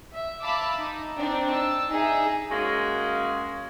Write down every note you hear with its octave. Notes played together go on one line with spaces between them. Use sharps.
E5
E5 F5 A5 B5 D6 E6
D#4
C4 D4 D#4
A5 E6
D#4 G#4 E5
G#3 A#3 C#4 F#4 G#4